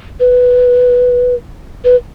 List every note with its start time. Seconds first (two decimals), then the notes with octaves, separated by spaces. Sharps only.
0.20 B4
1.85 B4